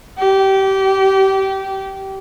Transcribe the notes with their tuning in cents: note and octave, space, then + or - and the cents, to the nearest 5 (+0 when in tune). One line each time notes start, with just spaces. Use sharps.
G4 -25